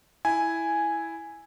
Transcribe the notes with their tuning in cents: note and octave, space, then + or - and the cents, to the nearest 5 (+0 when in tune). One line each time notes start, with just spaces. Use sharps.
E4 +0 G#5 +0